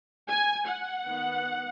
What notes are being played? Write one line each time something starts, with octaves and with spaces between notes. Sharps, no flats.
G#5
F#5
D#3 B3